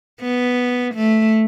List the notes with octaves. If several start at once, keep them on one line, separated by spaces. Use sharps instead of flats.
B3
A3